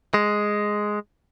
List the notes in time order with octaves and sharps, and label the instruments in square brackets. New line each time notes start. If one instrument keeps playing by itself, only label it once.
[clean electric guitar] G#3